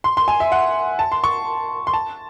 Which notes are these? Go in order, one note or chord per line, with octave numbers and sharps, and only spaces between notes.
C6
C6
G#5
E5
F#5
A5
C6
C#6
C6
A5